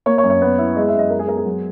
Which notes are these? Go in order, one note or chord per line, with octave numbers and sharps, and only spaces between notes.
A#3 C#5
C#5
F#2
C#5
B3
E4
G#3 D#5
E5
F#2 D#5
G#3 A#4
G#4
B3 A#4
G#4
F#3